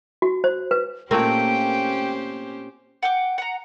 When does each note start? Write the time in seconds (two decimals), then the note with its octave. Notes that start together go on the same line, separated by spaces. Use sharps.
0.22 F#4
0.44 C5
0.71 B4
1.11 A#2 A3 A#3 C4 C#4 G4 C5 G5
3.03 F#5 G5 D6
3.38 F#5 A#5